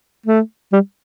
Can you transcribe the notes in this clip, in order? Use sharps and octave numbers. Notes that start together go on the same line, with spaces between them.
A3
G3